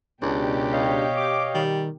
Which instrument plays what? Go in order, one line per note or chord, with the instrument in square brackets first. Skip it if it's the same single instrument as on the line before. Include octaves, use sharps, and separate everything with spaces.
[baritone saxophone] C#2 [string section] B2 G4 [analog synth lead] D4
[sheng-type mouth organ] C#5 D#5 F5
[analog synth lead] D6
[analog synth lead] D#3 [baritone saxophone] G3